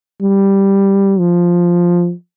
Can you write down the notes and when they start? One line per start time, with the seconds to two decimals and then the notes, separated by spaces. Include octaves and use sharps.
0.22 G3
1.19 F3